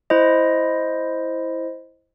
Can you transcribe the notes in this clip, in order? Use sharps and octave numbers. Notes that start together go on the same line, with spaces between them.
E4 C5 D#5